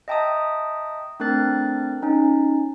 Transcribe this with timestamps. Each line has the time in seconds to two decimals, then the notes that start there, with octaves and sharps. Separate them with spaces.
0.08 D#5 E5 G5 A5 A#5 D#6
1.20 A3 C4 D4 A#4 F#6 A6
2.03 C#4 D#4